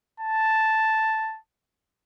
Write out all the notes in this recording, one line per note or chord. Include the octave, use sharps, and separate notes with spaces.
A5